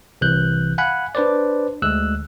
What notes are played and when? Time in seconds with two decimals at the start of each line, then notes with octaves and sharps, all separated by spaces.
0.21 C2 C3 E3 F#6 G6
0.78 F5 F#5 G#5 B5 F#6
1.15 D4 B4 C5 D5
1.82 D2 G#3 E6 F#6